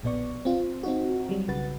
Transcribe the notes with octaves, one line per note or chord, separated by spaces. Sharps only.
A#1 B2 B3 D5 C#6
C4 F4
C4 D#4 F#4
F#3 G3
B1 C#3 F#4 B4 A6